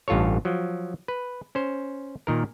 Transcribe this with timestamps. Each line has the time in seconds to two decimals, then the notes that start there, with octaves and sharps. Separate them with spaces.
0.08 A1 G2 F4 A4 C#5
0.45 F3 F#3
1.08 B4
1.55 C#4 C5
2.27 A#2 D#3 A#4